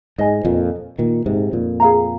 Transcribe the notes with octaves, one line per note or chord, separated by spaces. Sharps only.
G#2 G#4 D#5 G#5
F2 A#2
A#2 D#3
G#2 C3
F2 A#2
G#4 F5 A#5